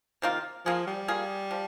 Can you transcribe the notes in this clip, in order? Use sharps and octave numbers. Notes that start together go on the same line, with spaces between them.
C3 D#3 A#3 F4
F3 A#3 F4 G#4
G3
A#3 F4 G#4
F3